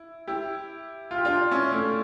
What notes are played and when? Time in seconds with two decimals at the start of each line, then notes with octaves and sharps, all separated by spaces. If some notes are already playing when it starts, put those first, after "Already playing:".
Already playing: E4
0.27 E4 G4
1.11 F4
1.18 G4
1.25 D4 F4
1.51 C#4 E4
1.73 A3 C#4